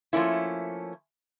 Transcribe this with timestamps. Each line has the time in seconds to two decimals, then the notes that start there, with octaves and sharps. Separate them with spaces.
0.13 F3 A3 A#3 C#4 E4